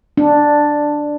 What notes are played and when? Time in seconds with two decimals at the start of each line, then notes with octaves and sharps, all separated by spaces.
0.17 D4